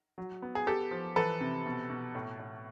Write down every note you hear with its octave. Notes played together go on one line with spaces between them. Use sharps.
F#3
B3
G#4
B3 G4 A4
F3
E3 A4 B4
C3
B2
B2
A2
A2